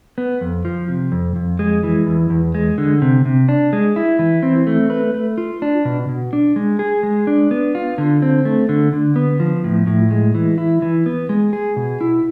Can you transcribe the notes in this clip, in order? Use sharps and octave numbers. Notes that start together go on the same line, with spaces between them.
B3
F2
F3
C3
F2
F2
G#3
E3
E2
E2
G#3
D3
C3
C3
D4
G#3
E4
E3
C4
A3
B4
A3
F4
D4
B2
B2
D4
G#3
G#4
G#3
D4
B3
F4
D3
C4
A3
D3
D3
B3
F3
A2
A2
G#3
E3
E4
E3
B3
G#3
G#4
B2
E4